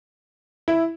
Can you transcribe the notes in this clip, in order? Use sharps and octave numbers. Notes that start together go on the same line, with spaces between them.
E4